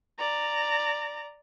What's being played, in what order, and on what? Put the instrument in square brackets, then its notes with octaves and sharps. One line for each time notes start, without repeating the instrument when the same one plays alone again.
[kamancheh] D5 A#5